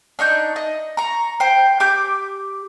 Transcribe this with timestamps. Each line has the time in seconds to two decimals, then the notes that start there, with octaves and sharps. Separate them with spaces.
0.19 D4 D#4 C#6 G6
0.56 D#5
0.97 A#5 C#6
1.40 C5 G5
1.80 G4 D6 G6